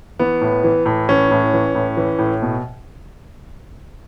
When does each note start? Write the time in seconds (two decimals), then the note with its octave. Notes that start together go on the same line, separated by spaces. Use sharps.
0.19 E3 B3
0.41 A2
0.64 E3
0.86 A2
1.09 E3 C#4
1.31 A2
1.53 E3
1.75 A2
1.97 E3
2.19 A2
2.42 B2